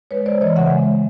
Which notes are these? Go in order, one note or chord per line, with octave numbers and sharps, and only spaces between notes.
G#3 B4 C#5
G#3 C5 D5
E3 C#5 D#5
C#3 E5 F#5
G#3